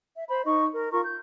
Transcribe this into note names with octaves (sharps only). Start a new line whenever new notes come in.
E5
C5 B5
D#4 D#5 C#6
A#4
F4 A#4 A#5 C#6
G6